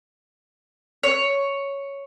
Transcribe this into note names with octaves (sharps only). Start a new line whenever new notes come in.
C#5